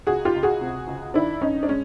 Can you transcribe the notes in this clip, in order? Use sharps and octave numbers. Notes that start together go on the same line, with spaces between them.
C#2 F#4 G#4
F4 G4
C#2
F#4 G#4
C3
C#2
D#3 D4 E4
G2 C#4 D#4
D4
G#3 C#4